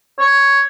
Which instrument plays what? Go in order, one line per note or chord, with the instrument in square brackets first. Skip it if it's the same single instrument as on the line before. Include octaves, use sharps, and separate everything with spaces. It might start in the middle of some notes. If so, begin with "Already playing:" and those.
[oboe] C#5